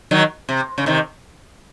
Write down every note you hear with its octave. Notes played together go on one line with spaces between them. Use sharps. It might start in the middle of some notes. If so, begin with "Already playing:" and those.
D#3 F#3
C3
C#3
C3 D#3